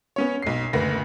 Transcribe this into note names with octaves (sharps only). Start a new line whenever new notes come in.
B3 C#4 C#5
B1 C7
F#1 D2 B4 A#6